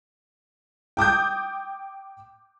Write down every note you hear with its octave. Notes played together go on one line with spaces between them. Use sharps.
G5 D6 D#6 G6